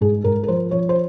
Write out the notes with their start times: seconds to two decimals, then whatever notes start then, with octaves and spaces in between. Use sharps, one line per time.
0.01 G#2 G#4
0.24 G#2 A#4
0.43 A#4
0.48 F3 C5
0.71 F3 C#5
0.89 C5